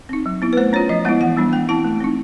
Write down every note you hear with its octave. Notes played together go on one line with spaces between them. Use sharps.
C4 D#4
F#3
B3 E4
B4
A3 C5
C#4 F4 C#5
F3 D#5
G#3 B3 E4 E5
E3 F#5
G3 B3 D4
G#3 G5
C4 E4 A5
A3
C4 D#4